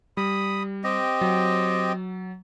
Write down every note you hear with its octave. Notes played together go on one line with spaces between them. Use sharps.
G3 B5 D#6
C4 G4 D#5
F#3